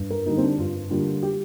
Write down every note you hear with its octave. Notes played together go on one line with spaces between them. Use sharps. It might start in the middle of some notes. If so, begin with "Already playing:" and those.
Already playing: G2
A#4
D3 G3 A#3 D#4
C4
D4
G2 F4
D3 G3 A#3 F4
G4